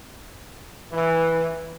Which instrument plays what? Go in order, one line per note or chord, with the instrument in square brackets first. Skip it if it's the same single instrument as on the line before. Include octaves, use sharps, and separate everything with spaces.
[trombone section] E3